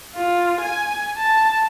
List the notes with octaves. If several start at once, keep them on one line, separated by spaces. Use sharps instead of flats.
F4
G#5
A5